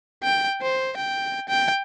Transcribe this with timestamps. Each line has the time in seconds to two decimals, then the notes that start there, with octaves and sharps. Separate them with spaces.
0.24 G5
0.62 C5
0.97 G5
1.49 G5